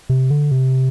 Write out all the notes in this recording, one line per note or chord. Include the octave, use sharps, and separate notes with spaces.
C3
D3
C3